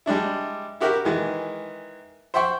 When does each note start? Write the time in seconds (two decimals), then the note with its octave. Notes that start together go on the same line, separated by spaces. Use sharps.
0.06 G3 G#3 D4 E4
0.80 E4 F#4 G4 A#4 E5
1.05 D#3 E3 G#3
2.34 C5 E5 F#5 G5 C6 C#6